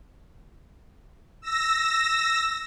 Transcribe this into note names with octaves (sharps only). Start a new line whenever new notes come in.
E6 A#6